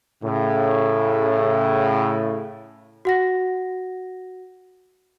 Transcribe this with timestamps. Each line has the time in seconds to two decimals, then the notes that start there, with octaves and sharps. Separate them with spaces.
0.23 A2 C#3
3.05 F#4 F#5 A#6